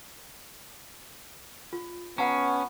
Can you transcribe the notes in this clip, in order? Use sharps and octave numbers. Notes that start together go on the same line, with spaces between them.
F4
B3 C#4 F#5 A5 A#5